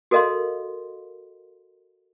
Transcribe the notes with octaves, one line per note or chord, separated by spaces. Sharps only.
F#4 A4 A#4 D#5 F5 C6